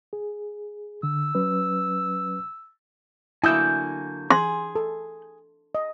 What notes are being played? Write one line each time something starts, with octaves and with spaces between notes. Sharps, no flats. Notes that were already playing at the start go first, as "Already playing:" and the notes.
G#4
D3 E6
F#3 C#4 B4
D3 F#3 A#3 E4 G#5 D#6 E6 G6
G#4 C6
A4
D#5